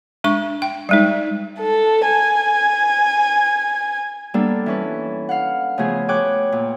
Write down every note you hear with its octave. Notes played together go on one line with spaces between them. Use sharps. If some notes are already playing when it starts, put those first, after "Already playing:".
G#3 D4 C#6
G5
G3 G#3 D#4
A4
G#5
G3 A#3 B3 D4 A4
E3 C#4 B4
F5 F#5
C#3 F3 A3 B3 G#4
G#4 C#5 G5 D6 F#6
A#2